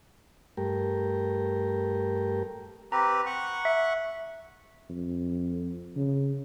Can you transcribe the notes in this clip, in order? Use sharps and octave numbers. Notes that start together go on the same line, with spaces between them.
G2 A3 G4 A#4
C4 G4 B4 A#5
F#5 C#6
E5
F2
C#3